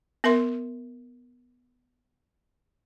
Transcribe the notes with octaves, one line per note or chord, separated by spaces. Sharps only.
B3 A#4 E5 C6